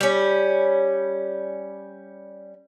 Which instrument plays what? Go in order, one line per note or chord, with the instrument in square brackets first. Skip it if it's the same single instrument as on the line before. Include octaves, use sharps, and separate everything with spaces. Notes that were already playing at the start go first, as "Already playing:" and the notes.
[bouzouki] G3 C#4